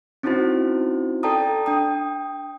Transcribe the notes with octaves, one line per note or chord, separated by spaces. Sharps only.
C4 C#4 D#4 E4 F#4 C5
A4 D5 G5 A5 A#5 D#6
D4 G5 D#6